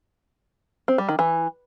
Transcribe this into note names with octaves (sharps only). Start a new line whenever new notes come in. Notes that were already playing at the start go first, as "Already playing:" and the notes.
C4
G3
D#3
E3